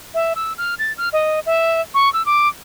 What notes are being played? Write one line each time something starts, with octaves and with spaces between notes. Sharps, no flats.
E5
E6
F6
A6
F6
D#5
E5
C#6
E6
D6